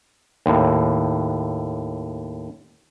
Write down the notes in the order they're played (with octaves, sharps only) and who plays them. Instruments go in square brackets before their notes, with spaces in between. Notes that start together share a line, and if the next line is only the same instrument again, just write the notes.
[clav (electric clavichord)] D#2 A2